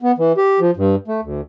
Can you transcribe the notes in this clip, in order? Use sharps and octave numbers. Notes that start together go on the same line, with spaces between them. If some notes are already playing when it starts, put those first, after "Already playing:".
B3
E3
G4
F3
G2
A3
D2